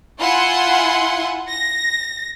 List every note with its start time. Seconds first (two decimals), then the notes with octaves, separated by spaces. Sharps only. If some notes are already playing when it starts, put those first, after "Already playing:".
0.20 E4 F4 F#5 G#5 C6
1.48 A#6